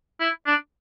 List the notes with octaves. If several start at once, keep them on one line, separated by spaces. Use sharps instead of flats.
E4
D4